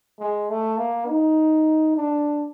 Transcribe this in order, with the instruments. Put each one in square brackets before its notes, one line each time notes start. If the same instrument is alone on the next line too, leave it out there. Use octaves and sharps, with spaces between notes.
[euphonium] G#3
A3
A#3
D#4
D4